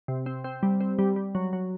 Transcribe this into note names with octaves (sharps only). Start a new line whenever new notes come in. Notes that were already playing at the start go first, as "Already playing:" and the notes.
C3
C4
C4
G3
C4
G3
G3
F#3
F#3